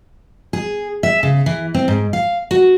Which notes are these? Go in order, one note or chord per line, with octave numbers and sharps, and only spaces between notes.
G#4
E5
C#3
E3
C4
G#2
F5
F#4